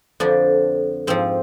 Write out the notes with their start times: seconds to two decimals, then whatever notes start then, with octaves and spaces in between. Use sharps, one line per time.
0.20 F2 D3 F3 D4
1.07 G#2 F3 C4